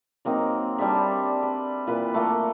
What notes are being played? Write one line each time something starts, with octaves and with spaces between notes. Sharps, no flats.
F#3 A#3 C4 D#4
G3 D4 A4 E5
B4
A#2 E3 B4
A3 A#3